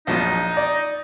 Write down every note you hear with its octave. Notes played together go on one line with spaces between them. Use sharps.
A#1 F3 F#3 D#4
D5